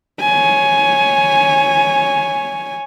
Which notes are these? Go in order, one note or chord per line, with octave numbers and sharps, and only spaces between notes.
C#5 G#5